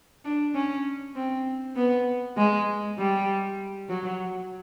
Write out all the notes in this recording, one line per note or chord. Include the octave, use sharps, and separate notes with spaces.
D4
C#4
C4
B3
G#3
G3
F#3